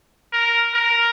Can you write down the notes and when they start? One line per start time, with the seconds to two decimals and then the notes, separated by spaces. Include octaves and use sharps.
0.33 A#4
0.74 A#4